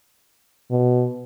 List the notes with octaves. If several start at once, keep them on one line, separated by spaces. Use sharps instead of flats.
B2